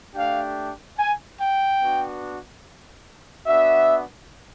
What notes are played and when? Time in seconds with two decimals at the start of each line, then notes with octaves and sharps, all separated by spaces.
0.16 A3 D4 G4 F5
0.98 G#5
1.39 G5
1.81 B3 D4 F#4
3.46 B3 D4 F#4 E5